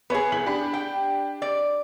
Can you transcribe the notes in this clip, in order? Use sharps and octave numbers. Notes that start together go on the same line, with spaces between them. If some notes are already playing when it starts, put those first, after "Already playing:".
B3 G#4 B4 C#5
C2 B6 F#7
D4 G4 B5
G5
D5